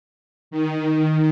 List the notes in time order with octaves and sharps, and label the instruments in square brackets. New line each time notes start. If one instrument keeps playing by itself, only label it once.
[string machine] D#3